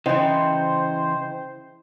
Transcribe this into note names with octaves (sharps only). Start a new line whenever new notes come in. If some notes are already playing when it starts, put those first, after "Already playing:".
C#3 E3 E4 C5 D#5 G5